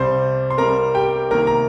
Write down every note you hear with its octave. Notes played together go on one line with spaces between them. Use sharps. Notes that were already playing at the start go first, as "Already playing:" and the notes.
Already playing: C2 C3 G3 C5 C6
C6
C2 C3 G3 A#4 A#5
G4 G5
C2 C3 D#3 A#3 A#4 A#5
A#5